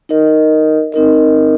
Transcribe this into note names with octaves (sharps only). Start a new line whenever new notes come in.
D#4 A#4 D#5
C4 D#4 A#4 D#5